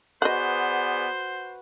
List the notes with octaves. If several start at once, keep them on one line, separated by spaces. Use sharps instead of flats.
B3 F#4 G#4 B4 C5 D5 D#5 F#5